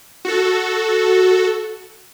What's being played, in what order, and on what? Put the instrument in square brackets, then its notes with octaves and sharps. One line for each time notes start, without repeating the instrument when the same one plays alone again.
[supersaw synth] F#4 A4